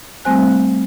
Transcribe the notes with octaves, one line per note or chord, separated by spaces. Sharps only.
G3 A3 C4 C5 G#5 F#6